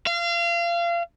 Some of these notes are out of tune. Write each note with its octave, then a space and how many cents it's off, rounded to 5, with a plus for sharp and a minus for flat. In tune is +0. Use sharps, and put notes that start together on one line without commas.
F5 -30